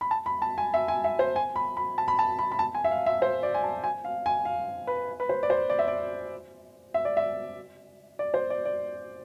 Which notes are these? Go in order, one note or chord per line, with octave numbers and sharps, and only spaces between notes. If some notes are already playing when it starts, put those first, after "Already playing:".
B5
A5
B5
A5
G#5
E5
G#5
E5
C5
G#5
B5
B5
A5
B5
A5
B5
B5
A5
G#5
E5
F5
E5
C5
D5
G#5
A5
G#5
F5
G#5
F5
B4
B4
C5
D5
C5
D5
E5
D5
E5
D5
E5
D5
C5
D5
D5